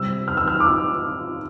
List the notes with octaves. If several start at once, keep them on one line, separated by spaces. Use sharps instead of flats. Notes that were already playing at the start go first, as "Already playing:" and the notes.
Already playing: C3 G3 C4 E6
F6
E6
F6
D6
E6